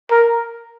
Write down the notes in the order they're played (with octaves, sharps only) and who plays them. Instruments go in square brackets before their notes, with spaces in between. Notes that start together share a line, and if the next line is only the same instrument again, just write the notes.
[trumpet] A#4